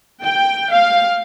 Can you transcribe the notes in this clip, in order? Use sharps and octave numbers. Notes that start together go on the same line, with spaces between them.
G5
F5